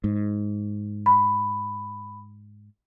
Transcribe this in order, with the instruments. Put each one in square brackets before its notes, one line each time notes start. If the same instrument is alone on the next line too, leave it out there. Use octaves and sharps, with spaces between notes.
[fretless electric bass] G#2
[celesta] B5